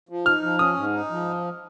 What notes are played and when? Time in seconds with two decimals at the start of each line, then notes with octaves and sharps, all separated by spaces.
0.09 F3
0.25 D#4 F6
0.43 F3
0.59 C#4 D#6
0.76 G#2
0.93 D#4
1.10 F3